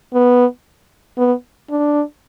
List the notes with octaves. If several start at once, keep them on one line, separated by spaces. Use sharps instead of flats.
B3
B3
D4